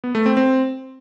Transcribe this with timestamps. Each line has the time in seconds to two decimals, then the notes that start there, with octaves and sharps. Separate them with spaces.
0.04 B3
0.15 A3
0.26 C4
0.37 C4